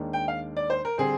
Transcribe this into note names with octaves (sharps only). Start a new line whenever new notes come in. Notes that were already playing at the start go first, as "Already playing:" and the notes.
Already playing: D#2 D#3 G#3 D4
G5
F5
D5
C5
A#4
D3 G3 C4 G#4